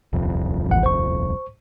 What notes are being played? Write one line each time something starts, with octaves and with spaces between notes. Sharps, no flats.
D#1 C2 F2
A1 D#2 F#5
C5 C#6